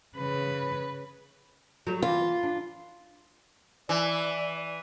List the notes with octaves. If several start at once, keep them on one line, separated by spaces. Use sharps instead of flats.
C#3 B4
F#3 G3 A3
E3 F4
D4
E3 D5